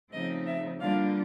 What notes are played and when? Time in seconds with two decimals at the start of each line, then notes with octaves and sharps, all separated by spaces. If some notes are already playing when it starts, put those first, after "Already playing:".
0.12 C#3 F3 A3 C4 D#4 D#5
0.45 E5
0.80 D3 G3 A#3 D4 F4 F5